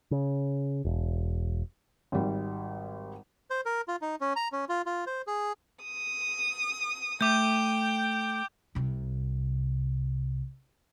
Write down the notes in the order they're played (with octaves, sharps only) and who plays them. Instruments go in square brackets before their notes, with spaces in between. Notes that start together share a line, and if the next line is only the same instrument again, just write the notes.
[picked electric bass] C#3
E1
[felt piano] G#1 G3
[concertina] C5
A#4
F4
D#4
C#4
A#5
C#4
F4
F4
C5
G#4
[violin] D#6
[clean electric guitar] A3 E5 [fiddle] G5 [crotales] D6 G6
[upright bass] C2 C3